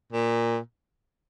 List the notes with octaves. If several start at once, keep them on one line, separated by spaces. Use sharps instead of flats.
A#2